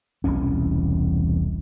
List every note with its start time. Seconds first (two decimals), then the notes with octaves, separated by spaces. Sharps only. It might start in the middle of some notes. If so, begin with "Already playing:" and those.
0.24 E1 C2 E3 C#4